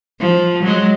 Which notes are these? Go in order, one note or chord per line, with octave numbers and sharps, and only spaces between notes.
F3
F#3 G#3